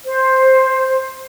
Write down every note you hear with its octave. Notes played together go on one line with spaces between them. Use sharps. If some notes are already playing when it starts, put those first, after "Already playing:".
C5